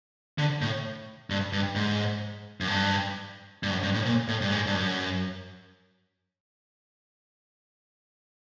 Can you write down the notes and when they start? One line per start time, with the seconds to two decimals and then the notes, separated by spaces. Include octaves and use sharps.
0.38 D3
0.62 A2
1.30 G2
1.53 G2
1.75 G#2
2.61 F#2
2.68 G2
3.63 G2
3.71 F#2
3.83 G2
3.94 A2
4.05 A#2
4.28 A2
4.42 G2
4.52 G#2
4.67 G2
4.74 F#2